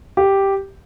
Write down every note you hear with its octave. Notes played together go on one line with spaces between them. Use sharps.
G4